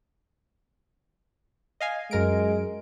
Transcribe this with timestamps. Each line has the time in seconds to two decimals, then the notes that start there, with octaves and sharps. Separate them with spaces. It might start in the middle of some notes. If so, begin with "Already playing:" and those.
1.80 D#5 F5 G#5
2.11 F#2 G#3 A#4 D7